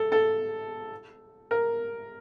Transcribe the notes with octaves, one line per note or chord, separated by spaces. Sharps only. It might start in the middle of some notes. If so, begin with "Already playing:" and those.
Already playing: A4
A4
A#4